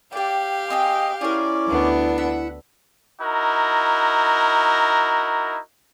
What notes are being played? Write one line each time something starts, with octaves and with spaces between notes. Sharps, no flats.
G4 D5 F5 G5
C4 G#4 D#5 G5
C#4 E4 G#4 A#4 D5
D2 B3 D4
E5 F#5
D#4 E4 F#4 A#4